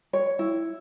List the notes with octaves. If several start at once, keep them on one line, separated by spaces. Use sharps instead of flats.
C#5
E4